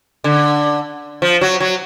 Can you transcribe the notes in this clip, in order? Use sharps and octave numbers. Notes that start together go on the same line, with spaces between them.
D3
F3
F#3
F#3